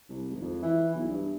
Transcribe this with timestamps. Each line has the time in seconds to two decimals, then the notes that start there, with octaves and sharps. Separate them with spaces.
0.09 C2
0.29 G#1
0.41 F2
0.62 E3
0.94 B1
1.08 G2